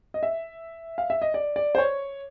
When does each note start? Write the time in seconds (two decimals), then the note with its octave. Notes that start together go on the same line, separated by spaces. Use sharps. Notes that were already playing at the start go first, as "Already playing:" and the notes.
0.14 D#5
0.23 E5
0.98 F5
1.10 E5
1.22 D#5
1.34 D5
1.56 D5
1.75 C5
1.78 C#5